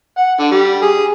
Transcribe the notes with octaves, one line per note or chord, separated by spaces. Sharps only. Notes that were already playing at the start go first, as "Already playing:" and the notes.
F#5
D3
G3
G#4